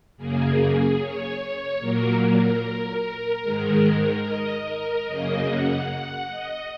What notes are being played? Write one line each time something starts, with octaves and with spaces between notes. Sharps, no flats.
F#2 C#3 A#3 G#4
G#4
C#5
C#5
A#2 F#3 A#3 A#4
A#4
G#2 D#3 G#3
D#5
A#4
F#2 C#3 A#3 D#5
F#5
F#5
D#5